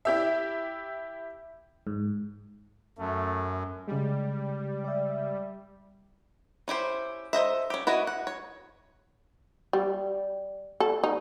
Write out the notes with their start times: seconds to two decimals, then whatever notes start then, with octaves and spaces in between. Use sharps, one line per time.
0.05 E4 G4 E5
1.87 G#2
2.99 F#2 A3
3.88 C#3 G3 G#3
4.84 D5 E5
6.68 C#4 E4 G4 C5
7.33 A4 C5 D#5 E5
7.70 C#4 G4
7.87 E4 F#4 C#5 D#5
8.07 F#5
8.27 C#5
9.73 G3
10.80 A4
11.04 D#4